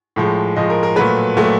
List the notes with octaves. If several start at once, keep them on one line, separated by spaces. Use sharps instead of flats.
A2 F3 G#3
A2 F3 G#3 D#5
A#4
A#4
A#2 F#3 A3 B4
A#2 F#3 A3